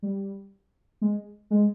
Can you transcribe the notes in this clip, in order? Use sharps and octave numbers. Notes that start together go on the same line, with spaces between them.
G3
G#3
G#3